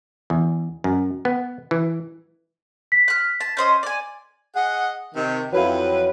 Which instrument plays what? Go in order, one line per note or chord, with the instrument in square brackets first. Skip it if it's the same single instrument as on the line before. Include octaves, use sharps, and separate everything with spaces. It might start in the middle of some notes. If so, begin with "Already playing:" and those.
[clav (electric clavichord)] E2
F#2
B3
E3
[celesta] B6
[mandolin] F6 F#6
A5
C#4 C5 D#5
D5 G#5
[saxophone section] G#4 D#5 F#5
C3 D#3
[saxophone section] F2 B4 [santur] F#3 E4 F5